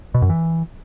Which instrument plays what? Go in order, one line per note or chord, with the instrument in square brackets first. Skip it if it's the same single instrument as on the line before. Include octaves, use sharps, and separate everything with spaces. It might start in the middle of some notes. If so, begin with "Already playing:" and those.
[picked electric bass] B2
F#2
E3